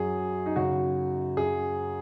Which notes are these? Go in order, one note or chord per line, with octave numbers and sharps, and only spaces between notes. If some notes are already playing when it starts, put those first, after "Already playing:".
Already playing: F#2 F#3 G#4
D#4
F#2 C#3 F#3 F#4
F#2 F#3 G#4